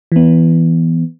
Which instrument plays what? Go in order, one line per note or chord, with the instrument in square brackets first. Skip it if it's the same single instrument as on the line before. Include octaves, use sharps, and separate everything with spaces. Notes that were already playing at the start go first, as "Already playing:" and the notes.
[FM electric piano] E3 B3